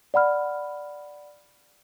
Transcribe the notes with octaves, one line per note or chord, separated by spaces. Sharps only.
D5 F#5 B5 F6